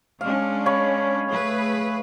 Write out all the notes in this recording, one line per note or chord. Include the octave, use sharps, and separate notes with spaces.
G#3 C#4 D4 F5
C#5 F5 B5
A3 G#4 B4